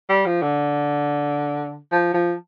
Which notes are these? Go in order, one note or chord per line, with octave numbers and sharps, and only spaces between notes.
G3
F3
D3
F3
F3